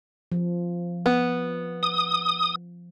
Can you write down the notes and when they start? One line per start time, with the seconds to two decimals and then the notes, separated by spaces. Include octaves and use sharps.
0.32 F3
1.06 B3
1.83 D#6